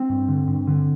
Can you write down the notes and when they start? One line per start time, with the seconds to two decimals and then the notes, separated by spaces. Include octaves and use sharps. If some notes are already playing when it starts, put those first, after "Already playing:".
Already playing: C4
0.09 G2
0.28 D3
0.48 G2
0.67 D3